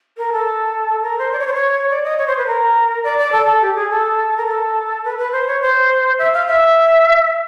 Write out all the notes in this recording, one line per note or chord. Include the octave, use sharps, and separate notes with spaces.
A#4
A4
A#4
C5
D5
C#5
C5
C#5
D5
D#5
C#5
C5
B4
A#4
D5
D5
A4
A4
G4
G#4
A4
A#4
A4
B4
B4
C5
C#5
C5
E5
F5
E5